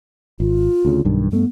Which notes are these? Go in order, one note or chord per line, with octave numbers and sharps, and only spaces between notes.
G#1 F4
D2 C#3
B1 G2 D#3
G2 A3 B3